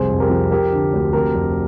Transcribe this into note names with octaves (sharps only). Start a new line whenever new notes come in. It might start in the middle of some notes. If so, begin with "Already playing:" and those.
Already playing: F1 C2 G#4 C5
F2
G4 A#4
F3
F3 G4 A#4
D3
D2
F1 G4 A#4
F2